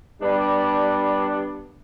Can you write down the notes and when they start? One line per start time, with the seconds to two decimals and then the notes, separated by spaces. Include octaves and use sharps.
0.21 G3 B3 D4